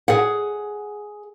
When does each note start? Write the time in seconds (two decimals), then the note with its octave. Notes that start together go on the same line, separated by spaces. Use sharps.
0.08 G#4 F#5